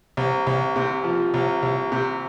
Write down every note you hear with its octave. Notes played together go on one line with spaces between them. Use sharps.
C2
C2
C3
F3
C2
C2
C3